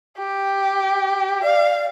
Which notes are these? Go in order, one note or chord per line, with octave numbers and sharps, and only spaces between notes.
G4
D5 F5